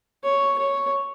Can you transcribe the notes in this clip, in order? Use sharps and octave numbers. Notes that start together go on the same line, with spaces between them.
C#5
C#5